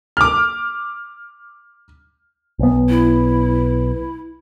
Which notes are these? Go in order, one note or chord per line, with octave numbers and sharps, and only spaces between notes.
D6 F6
B1 B3
E4